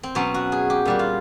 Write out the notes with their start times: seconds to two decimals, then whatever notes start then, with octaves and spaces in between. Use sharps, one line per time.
0.03 C4
0.15 B2 F#3 C#4
0.34 F#4
0.52 G#4
0.70 G4
0.85 A#2 G3 F#4
0.99 F4